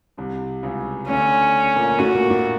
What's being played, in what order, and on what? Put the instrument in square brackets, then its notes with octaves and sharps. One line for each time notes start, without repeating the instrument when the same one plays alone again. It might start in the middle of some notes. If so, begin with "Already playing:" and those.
[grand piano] C2 C3
C#2 C#3
[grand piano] D2 D3 [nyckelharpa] C#4
[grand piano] A#2 A#3
[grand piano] A2 A3 [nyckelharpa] F#4
[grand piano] A#2 A#3
A2 A3